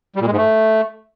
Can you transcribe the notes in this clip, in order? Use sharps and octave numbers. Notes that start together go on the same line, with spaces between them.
G3
A#2
G#3
G#2
A3